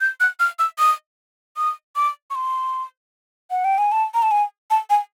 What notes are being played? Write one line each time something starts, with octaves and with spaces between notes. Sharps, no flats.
G6
F#6
F6
E6
D#6
D#6
D6
C#6
C6
F#5
G5
G#5
A5
A#5
A5
G#5
A5
G#5